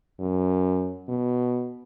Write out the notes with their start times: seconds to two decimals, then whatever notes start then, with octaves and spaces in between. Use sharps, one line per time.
0.20 F#2
1.09 B2